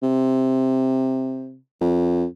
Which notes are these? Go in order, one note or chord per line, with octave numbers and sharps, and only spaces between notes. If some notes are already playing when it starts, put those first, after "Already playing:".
C3
F2